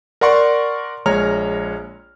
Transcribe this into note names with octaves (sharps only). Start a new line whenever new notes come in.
A#4 D5 F#5 C6 C#6
A#1 G#3 C#5 A#5 F6